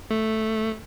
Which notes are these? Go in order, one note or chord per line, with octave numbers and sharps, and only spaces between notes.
A3